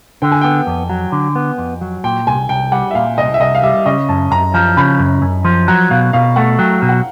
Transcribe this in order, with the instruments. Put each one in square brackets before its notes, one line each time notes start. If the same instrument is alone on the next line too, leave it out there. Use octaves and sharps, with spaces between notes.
[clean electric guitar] D3 [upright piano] G5
[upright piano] G#5
[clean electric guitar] B3 [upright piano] G5
[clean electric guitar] F2
F#3
D3
B3
F2
F#3
[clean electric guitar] A#2 [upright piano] G5
[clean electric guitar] C2 [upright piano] G#5
[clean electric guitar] C2 [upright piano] G5
[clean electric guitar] G3 [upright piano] F#5
[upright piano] E5
[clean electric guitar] A#2 [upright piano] F5
[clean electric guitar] C2 [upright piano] D#5
[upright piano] E5
[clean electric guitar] C2 [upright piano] D#5
[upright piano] F5
[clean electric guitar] G3 [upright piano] E5
[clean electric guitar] C#3 [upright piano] D#5
[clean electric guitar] F#2 [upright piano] A5
[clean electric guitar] F#2 [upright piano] A#5
[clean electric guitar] F3 [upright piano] A#5
[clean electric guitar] C#3 [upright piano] B5
[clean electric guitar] F#2
F#2
F3
[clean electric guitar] F#3 [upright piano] A#5
[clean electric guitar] B2 [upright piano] F5
[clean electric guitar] B2 [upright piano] F5
[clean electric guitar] A3 [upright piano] F#5
[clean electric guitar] F#3 [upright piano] G5
[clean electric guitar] B2
[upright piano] F#5